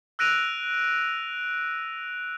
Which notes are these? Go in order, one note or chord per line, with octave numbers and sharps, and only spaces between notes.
E6 F#6 A#6 D7 D#7 F7